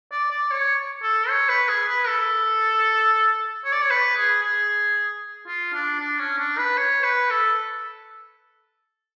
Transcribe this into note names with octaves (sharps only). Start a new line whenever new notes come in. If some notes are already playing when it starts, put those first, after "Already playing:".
D5
D5
C#5
A4
C#5
B4
G#4
B4
A4
C#5
D5
C#5
B4
G#4
G#4
F4
D4
D4
C#4
D4
B4
C#5
B4
A4